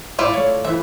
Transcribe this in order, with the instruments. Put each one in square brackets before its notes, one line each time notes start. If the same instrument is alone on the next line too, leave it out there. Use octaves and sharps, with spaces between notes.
[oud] G#2 [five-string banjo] E4 F4 D5
[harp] A3 A4 [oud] C#5
[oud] E3 [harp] E4 F4 C5 [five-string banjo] E5